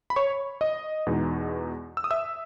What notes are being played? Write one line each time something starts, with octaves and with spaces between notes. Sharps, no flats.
B5
C#5 C#6
D#5 D#6
E2 B2 G#3 D#4
E6
D#6
E5 E6